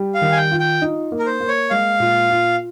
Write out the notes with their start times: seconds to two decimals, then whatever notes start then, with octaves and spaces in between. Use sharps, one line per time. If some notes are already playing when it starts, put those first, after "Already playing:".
Already playing: G3
0.14 F5
0.22 D#3
0.32 G#5
0.37 G5
0.51 F4
0.60 G5
0.82 D#4
1.12 A#3
1.19 A#4
1.26 C5
1.40 A#3
1.48 C#5
1.70 G#3 F5
2.00 A#2
2.30 F4